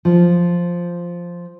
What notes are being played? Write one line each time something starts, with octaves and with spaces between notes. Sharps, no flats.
F3